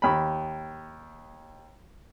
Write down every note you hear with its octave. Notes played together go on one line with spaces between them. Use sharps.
D#2 B5